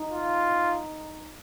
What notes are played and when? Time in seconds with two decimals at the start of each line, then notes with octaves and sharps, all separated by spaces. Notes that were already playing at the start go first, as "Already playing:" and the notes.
Already playing: D#4
0.12 F4